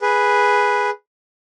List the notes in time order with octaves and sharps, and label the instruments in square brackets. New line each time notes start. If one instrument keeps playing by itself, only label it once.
[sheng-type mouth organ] G#4 B4